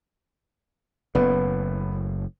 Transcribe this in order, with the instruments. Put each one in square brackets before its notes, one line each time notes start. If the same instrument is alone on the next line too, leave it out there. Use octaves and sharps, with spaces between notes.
[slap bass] F#1 A2 [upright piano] B3